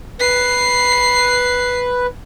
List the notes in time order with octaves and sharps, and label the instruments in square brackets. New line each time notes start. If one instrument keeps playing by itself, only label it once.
[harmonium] B4 [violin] C7